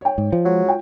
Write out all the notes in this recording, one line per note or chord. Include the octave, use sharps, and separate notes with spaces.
C#5 G5
G#2
F3
F#3 G#3
F4 G5